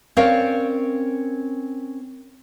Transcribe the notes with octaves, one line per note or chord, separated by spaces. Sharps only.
C4 C#4 A#4 C#5 D5 F5